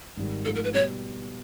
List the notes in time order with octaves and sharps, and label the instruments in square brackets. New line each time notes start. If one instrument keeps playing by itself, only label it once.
[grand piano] G#1 G#2 D#3 G3
[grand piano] G#2 F3 A3 [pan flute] A4
[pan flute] A#4
B4
[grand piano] B2 G3 [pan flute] C#5